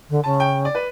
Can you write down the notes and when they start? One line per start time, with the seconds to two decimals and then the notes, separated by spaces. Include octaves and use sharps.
0.09 D3
0.24 C#3 A5
0.40 G5
0.65 D5
0.75 B4